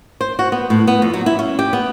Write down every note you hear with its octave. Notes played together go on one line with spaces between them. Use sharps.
C5
F#4
B3
A2
B3
F2
F#3
E4
C#4
G4
B3